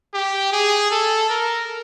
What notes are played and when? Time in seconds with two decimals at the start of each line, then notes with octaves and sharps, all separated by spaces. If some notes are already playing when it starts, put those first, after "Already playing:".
0.14 G4
0.52 G#4
0.91 A4
1.30 A#4